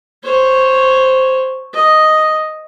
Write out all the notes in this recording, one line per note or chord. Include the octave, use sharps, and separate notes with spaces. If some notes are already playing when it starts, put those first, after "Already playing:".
C5 C#5
D#5